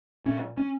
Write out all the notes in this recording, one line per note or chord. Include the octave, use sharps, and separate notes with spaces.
A#2 C#4
C#4